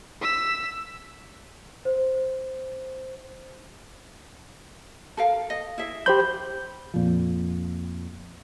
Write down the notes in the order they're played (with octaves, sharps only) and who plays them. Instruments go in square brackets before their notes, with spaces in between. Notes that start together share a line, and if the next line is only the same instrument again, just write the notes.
[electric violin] E6 B6
[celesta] C5
[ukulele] A4 A#4 F5
D#5
E4 G#4 E5
[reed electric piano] G4 C5 G6 [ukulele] B5
[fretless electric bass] F2 A#2 F3